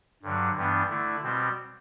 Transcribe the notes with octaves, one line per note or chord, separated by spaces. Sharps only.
G2 D3 F#3
G2 E3 G3 B3 D4
D3 A3 E4
B2 G3 C4